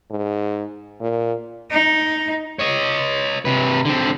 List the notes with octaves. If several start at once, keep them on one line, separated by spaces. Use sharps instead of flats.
G#2
A#2
D#4
C#5 D#5
C3 B4
D3 C4